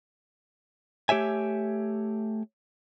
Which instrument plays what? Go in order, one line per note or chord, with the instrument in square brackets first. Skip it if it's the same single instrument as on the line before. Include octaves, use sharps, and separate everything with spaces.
[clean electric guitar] A3 G4 C#5 E5 G#5